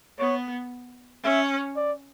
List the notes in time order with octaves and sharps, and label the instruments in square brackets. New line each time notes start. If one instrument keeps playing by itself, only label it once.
[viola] B3 [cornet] C#5
[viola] C#4 [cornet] E5
[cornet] D5